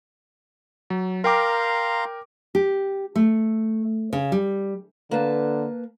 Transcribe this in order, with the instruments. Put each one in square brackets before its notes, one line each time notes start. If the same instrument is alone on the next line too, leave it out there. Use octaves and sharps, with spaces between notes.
[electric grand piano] F#3
[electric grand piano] A#4 G5 D6 [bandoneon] F5 A#5 C6
[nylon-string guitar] G4
A3
C#3
G3
[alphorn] D3 [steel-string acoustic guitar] A#3 B4 A5